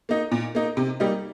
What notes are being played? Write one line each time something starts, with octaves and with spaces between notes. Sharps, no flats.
A#3 D#4
A#2
A#3 D#4
C3
G3 A#3 D#4